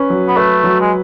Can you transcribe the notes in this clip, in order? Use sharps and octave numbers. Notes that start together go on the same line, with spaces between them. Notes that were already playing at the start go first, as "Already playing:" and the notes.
Already playing: C#4 B4
F#3
B3
A3 B4
F#3
G#3